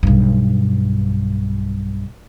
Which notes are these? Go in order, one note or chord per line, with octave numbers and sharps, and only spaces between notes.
B1 G2